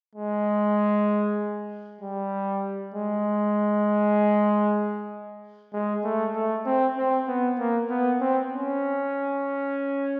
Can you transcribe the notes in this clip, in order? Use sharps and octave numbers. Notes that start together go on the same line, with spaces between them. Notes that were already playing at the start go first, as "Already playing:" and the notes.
G#3
G3
G#3
G#3
A3
A3
C4
C4
B3
A#3
B3
C4
C#4